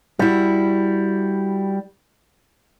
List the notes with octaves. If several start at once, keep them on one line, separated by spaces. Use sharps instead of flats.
G3 E4 F#4